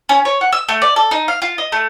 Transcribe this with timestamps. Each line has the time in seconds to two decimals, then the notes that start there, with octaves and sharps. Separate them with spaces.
0.09 C#4
0.25 C#5
0.41 F#5
0.52 E6
0.69 A3
0.82 D5
0.96 A4
1.11 D#4
1.28 F5
1.42 F4
1.58 D#5
1.72 A3